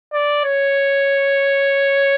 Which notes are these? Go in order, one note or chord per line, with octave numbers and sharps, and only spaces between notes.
D5
C#5